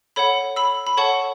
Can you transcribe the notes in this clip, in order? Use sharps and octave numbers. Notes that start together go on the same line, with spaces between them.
A4 C#5 F#5 B5
B5 E6
B5
A4 C#5 F#5 A5 C#6